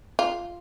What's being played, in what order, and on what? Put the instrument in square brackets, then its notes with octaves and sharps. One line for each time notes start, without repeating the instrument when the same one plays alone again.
[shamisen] F4